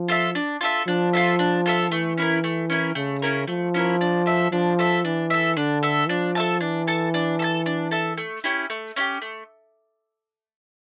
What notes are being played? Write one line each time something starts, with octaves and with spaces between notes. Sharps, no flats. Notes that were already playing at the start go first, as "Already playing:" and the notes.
Already playing: F3
F4 A4 E5
D4
F4 A4 E5
F3 D4
F4 A4 E5
D4
F4 A4 E5
E3 A3
C#4 E4 A#4
A3
C#4 E4 A#4
C#3 A3
C#4 E4 A#4
F3 A3
C#4 E4 A#4
D4
A4 E5
F3 D4
A4 E5
E3 D4
A4 E5
D3 D4
A4 E5
F3 D4
A4 E5 A5
E3 D4
A4 E5 A5
D4
A4 E5 A5
D4
A4 E5 A5
A3
C#4 E4 G4
A3
C#4 E4 G4
A3